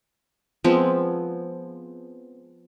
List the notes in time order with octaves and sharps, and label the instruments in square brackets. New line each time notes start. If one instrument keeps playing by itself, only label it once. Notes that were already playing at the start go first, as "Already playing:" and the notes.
[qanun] F3 G#3 B3 C4